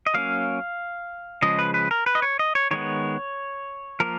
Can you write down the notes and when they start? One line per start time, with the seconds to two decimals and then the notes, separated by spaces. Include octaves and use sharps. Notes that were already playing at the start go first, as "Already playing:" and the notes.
0.06 D#5
0.14 F#3 A#3 C#4 F5
1.42 C#3 F3 G#3 D#5
1.59 B4
1.74 B4
1.91 A#4
2.06 B4
2.15 D#5
2.22 C#5
2.39 D#5
2.55 C#5
2.71 D#3 G#3 B3 C#5
4.00 F3 A#3 A#4